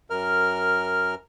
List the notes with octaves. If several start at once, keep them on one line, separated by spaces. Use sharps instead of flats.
F#2 A#4 F6